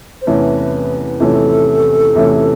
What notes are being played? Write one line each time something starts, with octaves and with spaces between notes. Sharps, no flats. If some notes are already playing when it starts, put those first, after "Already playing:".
C5
E2 C3 E3 A3 C#4 B4
E2 C3 E3 A3 C#4 A4
E2 C3 E3 A3 C#4